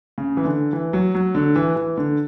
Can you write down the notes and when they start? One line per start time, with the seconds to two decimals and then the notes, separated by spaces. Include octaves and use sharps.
0.18 C#3
0.37 E3
0.45 D3
0.73 E3
0.93 F#3
1.15 F#3
1.35 D3
1.56 E3
1.76 E3
1.97 D3